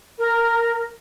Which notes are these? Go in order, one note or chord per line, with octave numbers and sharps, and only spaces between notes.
A#4